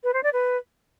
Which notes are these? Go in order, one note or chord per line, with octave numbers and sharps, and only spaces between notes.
B4
C5
D5
B4